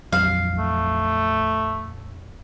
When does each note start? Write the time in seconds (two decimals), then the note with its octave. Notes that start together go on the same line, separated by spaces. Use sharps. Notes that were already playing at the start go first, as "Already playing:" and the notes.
0.12 A#1 F2 F#3 F5
0.58 A3